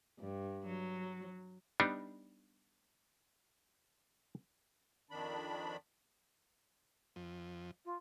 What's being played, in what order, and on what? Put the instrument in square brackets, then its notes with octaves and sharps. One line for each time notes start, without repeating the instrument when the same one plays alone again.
[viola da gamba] G2
F#3
[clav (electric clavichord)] G3 B3 D4 D#4
[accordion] F2 D#3 D4 B5
[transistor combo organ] F2
[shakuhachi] F4